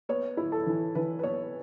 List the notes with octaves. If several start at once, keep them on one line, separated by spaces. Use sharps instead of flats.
B3 C#5
E4
A4
E3
E3 B4
B4
B3 C#5